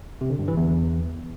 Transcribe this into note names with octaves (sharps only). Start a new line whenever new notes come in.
C3
D3
G2
E3
E2